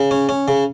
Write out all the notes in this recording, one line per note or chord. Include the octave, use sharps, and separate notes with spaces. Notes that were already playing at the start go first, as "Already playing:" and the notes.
Already playing: C#3
C#4
C#4
C#3